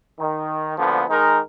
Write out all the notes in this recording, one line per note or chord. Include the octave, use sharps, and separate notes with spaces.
D#3
D2 D3 F3 A#3 B3
D#3 G#3 D#4 A#4